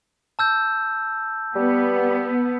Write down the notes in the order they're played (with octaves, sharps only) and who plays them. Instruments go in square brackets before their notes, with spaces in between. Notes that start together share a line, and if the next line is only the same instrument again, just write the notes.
[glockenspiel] A5 E6 G6
[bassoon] G3 [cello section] B3